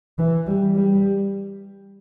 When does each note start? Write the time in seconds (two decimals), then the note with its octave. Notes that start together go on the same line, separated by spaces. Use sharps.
0.19 E3
0.47 G3
0.75 G3